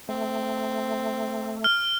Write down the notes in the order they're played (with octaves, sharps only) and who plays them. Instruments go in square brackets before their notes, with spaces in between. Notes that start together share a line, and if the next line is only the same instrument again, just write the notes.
[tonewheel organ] A3 [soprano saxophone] C4
[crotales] F6